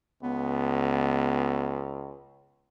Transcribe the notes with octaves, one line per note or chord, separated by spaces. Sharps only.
C#2 B3